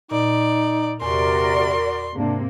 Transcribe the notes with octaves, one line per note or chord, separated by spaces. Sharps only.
A#2 D#4 D5
E2 C3 F#4 A#4 D5 C6
G#2 C3 A#3 D4